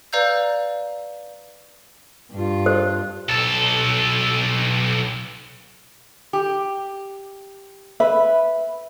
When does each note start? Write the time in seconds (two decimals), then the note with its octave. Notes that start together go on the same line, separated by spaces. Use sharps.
0.13 B4 D5 F5 A#5 E6 G6
2.32 G2 F4
2.66 C5
3.29 B1 A4
6.33 G4
8.00 B4 E5